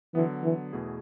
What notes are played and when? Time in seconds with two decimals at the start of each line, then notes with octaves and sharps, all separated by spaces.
0.15 D3 E3 F#3 B3
0.44 E3
0.73 E2 B2 A3 E4 G#4